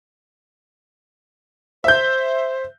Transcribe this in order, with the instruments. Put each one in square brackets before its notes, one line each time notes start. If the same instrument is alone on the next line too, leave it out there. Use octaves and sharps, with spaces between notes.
[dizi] C5 [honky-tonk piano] E5 G6